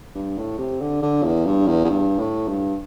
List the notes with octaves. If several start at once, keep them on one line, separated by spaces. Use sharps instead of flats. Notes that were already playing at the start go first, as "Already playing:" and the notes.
G2
A2
C3
D3
D3
E2
G2
E2
E2
G2
A2
G2